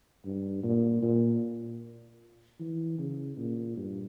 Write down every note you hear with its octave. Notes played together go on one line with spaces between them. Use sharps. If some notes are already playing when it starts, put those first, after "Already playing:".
G2
A#2
A#2
E3
C#3
A#2
G2